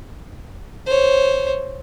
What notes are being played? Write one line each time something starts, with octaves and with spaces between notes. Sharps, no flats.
C5 C#5